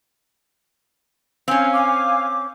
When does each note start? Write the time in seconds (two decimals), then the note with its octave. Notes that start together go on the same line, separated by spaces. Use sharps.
1.48 C4 C#4 F5 G#5
1.73 D6